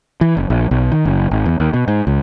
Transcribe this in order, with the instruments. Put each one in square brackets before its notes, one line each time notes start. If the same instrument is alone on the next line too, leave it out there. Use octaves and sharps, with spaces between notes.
[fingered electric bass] E3
F#1
A#1
B1
D#3
F#1
G#1
E2
D#2
B2
G#2
C#2